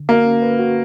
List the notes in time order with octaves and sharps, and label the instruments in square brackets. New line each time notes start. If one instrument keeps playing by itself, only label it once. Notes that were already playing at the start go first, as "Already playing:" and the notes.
Already playing: [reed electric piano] D3
[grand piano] A#3 [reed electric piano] F#4
[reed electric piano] C#4
B4
F#4